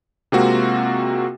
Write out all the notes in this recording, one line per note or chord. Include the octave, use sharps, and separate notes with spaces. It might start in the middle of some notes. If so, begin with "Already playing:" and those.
C3 G#3 A#3 C4 F4 F#4